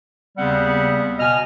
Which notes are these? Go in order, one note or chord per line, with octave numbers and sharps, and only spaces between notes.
D#2 C#3 G3 B3 C4 F#5
B2 B3 D#5 G#5 F6